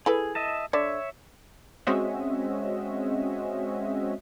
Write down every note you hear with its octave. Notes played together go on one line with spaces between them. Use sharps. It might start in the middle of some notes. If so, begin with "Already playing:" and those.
E4 G#4 A4 B4
D#5 E5 A5
D3 C#5 D5 E5
G#3 C4 C#4 F#4 D#5 E5